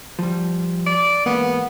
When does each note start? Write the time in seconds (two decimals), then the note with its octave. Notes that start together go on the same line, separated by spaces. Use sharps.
0.19 F3 G3
0.87 D5
1.26 E2 G#2 A#3 B3